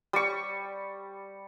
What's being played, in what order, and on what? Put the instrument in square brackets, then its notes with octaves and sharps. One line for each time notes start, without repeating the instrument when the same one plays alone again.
[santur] G3 C#6